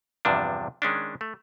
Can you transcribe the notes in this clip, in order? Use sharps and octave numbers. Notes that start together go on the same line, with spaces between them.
E2 G2 C3 F3 D4
D#3 G#3 C#4 D4
A3